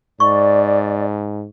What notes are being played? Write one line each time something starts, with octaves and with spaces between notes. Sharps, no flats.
G#2 D5 C#6